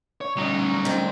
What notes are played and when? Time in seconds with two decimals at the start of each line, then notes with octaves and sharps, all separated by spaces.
0.21 C#5
0.37 D2 F#3 G3 C#4 D#4
0.85 D#3 C4